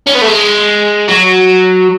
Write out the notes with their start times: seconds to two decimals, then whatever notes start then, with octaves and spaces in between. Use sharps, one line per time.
0.07 C#4
0.15 B3
0.22 A3
0.28 G#3
1.08 F#3